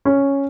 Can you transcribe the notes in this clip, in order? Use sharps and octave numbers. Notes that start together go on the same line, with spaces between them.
C#4